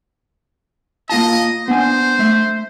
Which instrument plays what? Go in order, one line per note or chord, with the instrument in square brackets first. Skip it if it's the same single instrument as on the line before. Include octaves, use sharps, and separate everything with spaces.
[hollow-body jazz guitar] A#3 F4 A5 [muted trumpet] D#5
[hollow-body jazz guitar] B3 D4 G#5 [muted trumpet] C5
[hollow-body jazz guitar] A3 E5